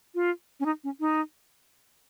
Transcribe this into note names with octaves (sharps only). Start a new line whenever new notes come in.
F4
C#4
D#4
C#4
D#4